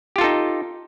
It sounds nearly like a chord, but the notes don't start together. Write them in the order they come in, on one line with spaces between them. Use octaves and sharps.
G4 F4 A4 D#4